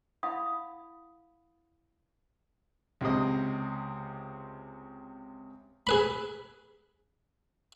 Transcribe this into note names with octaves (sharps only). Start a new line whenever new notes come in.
E4 F5 F#5 B5 D#6
C#2 C3 C4 D#5
G#4 B4 B5